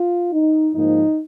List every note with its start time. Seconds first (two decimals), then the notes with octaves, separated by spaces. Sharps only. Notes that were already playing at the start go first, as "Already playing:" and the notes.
Already playing: F4
0.32 D#4
0.75 G#2 F3 A#3 D#4